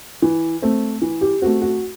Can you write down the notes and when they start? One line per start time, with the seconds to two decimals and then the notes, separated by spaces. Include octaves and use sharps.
0.22 E3
0.62 A3 C4
1.02 E3
1.21 G4
1.42 A3 C4 F#4
1.61 F#4